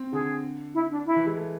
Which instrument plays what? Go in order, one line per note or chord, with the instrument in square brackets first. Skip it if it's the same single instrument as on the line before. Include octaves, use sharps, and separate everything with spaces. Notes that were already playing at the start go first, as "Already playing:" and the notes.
Already playing: [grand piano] C4
[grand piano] D3 [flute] G#4
[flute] E4
D4
E4
[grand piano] E3
G#3
A3